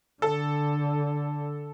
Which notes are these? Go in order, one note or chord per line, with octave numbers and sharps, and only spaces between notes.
D3 A4